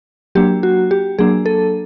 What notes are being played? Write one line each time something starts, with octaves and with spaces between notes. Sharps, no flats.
F#3 A#3 D4 G4
F#4
G4
F#3 A#3 D4 G#4
A4